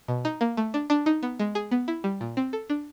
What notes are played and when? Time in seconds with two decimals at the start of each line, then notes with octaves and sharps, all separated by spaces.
0.08 B2
0.25 D#4
0.41 A#3
0.57 A3
0.74 D4
0.90 D4
1.06 D#4
1.23 B3
1.40 G#3
1.55 G#4
1.71 B3
1.88 E4
2.04 G3
2.21 A#2
2.37 C4
2.53 A4
2.70 D4